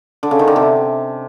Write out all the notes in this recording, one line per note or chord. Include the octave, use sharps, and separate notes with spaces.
D3
C#3
D#3
D3
C3